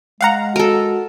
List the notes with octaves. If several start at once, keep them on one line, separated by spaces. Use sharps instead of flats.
G#3 F5 F#5 A#5
F#4 A4 A#4